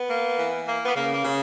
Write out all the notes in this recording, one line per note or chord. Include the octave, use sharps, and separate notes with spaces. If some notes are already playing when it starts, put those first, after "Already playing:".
Already playing: B3
A#3
E3
A#3
B3
C#3 A#3
A#3
C#3